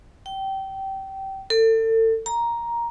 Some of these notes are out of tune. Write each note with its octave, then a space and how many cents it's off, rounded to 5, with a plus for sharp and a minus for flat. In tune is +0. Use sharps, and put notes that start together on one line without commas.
G5 -20
A4 +35
A#5 +10